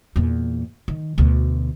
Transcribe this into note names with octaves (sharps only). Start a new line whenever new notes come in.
E2 A#2
D#3
D2 B2